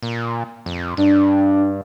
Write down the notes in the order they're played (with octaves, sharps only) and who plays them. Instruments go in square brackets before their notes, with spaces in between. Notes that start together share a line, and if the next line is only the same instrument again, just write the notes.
[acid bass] A#2
F2
[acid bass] G2 [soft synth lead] D4